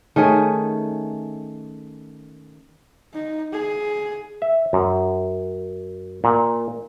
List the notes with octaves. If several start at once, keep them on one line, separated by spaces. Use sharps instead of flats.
D#3 A3 C#4 G#4
D#4
G#4
E5
F#2
A#2